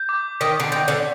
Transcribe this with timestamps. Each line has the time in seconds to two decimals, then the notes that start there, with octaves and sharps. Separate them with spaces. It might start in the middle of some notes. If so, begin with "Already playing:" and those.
Already playing: G6
0.09 D6
0.40 D#3 B6
0.60 D3
0.72 D#3 G6
0.88 D3